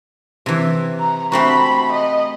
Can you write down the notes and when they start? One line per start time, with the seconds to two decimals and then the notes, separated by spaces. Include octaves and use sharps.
0.46 C3 E3
0.99 A#5
1.32 A3 C4 F#4 B5
1.92 D#5